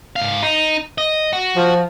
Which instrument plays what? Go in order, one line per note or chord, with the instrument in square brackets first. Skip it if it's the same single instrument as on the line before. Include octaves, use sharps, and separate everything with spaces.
[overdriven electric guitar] G#2 F5
D#4
D#5
F#4
[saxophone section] F3